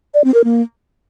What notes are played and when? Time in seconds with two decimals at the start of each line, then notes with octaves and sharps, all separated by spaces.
0.14 D5
0.24 C4
0.34 A#4
0.44 A#3